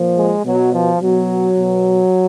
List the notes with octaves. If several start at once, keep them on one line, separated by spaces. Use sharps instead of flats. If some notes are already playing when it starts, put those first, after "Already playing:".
Already playing: A#2 F3
G#3
B2 F#3
F3
B2 F#3
B2